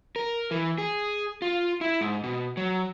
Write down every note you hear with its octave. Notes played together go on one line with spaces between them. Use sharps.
A#4
E3
G#4
F4
E4
G#2
B2
F#3